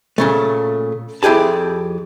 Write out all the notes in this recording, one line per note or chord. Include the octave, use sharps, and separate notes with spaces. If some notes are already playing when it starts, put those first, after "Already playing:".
A#2 C#3 A3
F2 E4 G4 G#4 A5